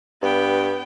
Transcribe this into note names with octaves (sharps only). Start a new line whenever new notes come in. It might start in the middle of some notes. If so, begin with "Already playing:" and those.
G2 B3 G5